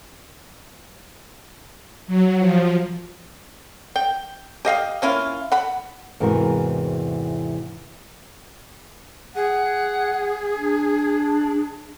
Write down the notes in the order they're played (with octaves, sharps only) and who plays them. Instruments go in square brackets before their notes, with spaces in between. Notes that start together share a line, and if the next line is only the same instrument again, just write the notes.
[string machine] F#3
F3
[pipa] G5
G4 D#5 F5 G5
A#3 C#4 E4 F4
F#5 B5
[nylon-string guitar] E2 G#2 C3 E3 F#4 A#4
[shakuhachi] G#4 [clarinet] F#5
[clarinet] D4